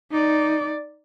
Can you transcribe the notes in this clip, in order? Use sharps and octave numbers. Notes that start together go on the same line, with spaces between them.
D#4 D5